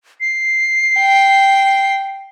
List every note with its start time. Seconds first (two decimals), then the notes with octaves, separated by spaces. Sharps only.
0.21 C7
0.99 G5